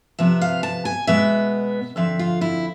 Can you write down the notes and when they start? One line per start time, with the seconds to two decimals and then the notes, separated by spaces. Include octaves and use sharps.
0.19 C3 F3 B3 E5
0.41 F5
0.63 A5
0.85 G#5
1.07 B2 G#3 B3 E5
1.96 F2 D3 F3 C4 E5
2.19 F4
2.41 E4